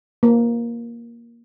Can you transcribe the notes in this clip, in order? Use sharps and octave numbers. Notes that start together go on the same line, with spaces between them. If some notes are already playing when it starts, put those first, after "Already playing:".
A#3